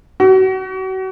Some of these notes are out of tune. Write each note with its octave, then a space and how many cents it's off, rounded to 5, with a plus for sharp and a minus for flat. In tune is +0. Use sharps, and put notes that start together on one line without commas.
F#4 +35